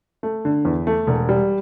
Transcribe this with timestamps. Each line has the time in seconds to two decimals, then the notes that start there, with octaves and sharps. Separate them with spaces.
0.23 A3
0.45 D3
0.65 E2
0.87 A3
1.07 E1
1.29 G3